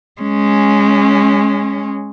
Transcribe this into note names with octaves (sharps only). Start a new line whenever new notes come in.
G#3 C#4